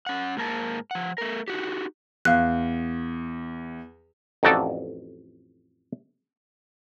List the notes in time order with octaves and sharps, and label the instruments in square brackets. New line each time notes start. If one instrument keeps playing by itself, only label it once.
[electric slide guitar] C#4 F#5
G#2 A#3 A#4 A5
F3 F#5
A3 A#4
D#4 F#4 G4
[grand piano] E2 [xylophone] F5 F#6
[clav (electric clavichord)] A1 F2 D#4 F#4 A4 D5